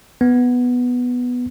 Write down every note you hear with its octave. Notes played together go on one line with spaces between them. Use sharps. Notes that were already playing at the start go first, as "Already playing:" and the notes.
B3